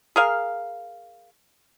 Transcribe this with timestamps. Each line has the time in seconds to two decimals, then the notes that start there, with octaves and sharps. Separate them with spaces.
0.16 G#4 A#4 F5